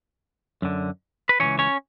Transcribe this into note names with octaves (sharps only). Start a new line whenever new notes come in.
F#2 D3
B4
C#2 C#3 E3 C#4 C#5
C#4 C#5